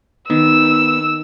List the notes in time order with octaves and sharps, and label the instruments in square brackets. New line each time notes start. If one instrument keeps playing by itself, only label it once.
[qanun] D#3 [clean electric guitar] B3 D#4 [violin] E6